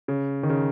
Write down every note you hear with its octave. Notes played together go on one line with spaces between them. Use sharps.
C#3
D#3
C#3